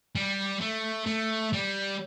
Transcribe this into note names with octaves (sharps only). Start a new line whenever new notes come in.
G3
A3
A3
G3